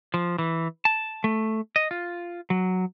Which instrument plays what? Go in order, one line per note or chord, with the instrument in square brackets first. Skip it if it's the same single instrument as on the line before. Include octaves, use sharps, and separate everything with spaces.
[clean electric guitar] F3
E3
A5
A3
D#5
F4
F#3